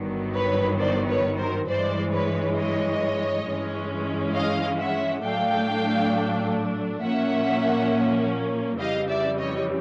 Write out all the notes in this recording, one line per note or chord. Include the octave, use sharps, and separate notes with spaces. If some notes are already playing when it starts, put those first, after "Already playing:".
Already playing: G1 G2 D#3 F#3 B3
B4 C#5
C5 D5
B4 C#5
A#4 C5
G2 E3 G#3 C5 D5
B4 C#5
C#5 D#5
G2 E3 G#3 C#4
D#5 F5
E5 F#5
A2 F#3 A3 D4 F5 G5
A#2 F3 A#3 C#4 E5 F#5
F2 C#3 E3 G3 D#5 F5
D5 E5
C#5 D#5